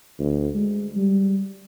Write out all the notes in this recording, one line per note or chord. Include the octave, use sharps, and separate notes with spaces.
D2
G#3
G3